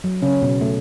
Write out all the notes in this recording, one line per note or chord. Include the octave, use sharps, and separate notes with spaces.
F#3
C#3 C#4
B2 B3
A3